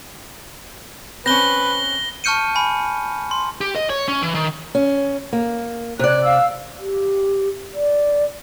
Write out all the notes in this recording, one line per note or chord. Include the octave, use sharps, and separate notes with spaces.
C4 C#4 B4 A#6 G7
A5 C#6 F6 G6 C#7 D#7
G#5 B5
C6
G4
D#5
C#5
C#4
E3
D#3
C#4
A#3
C3 C#5 D5 F#6
F5 E6
G4
D5